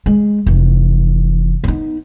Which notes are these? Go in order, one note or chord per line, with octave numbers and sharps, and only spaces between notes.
G#3
F1 E3
B3 D#4